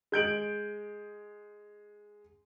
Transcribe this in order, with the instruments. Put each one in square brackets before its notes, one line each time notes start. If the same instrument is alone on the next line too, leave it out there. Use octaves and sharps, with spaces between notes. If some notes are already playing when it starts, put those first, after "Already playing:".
[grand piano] G#3 G6 D7 F#7